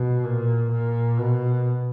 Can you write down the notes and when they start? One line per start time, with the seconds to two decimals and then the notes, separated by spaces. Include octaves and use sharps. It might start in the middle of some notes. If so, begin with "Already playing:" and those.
Already playing: B2
0.23 A#2
0.71 A#2
1.18 B2